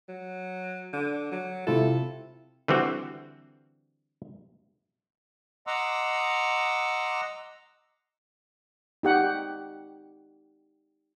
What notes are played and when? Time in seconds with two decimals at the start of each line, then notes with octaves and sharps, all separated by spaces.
0.08 F#3
0.93 D3
1.32 F#3
1.67 C3 E4 F4 A4
2.68 D3 E3 G3 C4 F#4
5.67 D#5 F#5 A#5 C6 D6 E6
9.03 D#4 G4 F#5